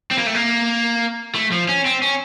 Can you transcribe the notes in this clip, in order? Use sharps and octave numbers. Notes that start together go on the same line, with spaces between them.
C4
A#3
A3
A#3
A3
F3
C#4
C4
C#4